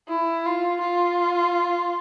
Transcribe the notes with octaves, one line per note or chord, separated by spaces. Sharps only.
E4
F4
F4